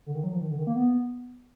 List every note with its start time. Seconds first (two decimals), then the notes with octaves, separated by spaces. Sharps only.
0.06 D3
0.15 D#3
0.24 F#3
0.33 F3
0.41 D#3
0.50 D3
0.58 D#3
0.67 A#3
0.76 B3